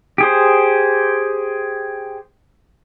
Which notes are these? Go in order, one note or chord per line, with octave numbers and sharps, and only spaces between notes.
G4 G#4 C5